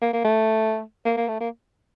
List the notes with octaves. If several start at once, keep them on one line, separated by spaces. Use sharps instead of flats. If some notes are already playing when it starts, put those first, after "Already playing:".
A#3
A#3
A3
A#3
A#3
A3
A#3